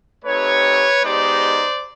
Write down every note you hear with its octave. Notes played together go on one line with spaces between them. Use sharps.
A3 C4 D#4 G4 B4 C#5
G#3 B3 D#4 G4 C5 D5